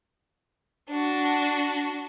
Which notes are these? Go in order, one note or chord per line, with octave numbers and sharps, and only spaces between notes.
D4 F#4